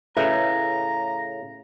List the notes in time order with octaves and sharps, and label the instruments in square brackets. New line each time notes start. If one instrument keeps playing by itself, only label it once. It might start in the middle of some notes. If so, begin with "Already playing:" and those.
[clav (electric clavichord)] A2 C#3 [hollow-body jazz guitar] B4 E5 [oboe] A#5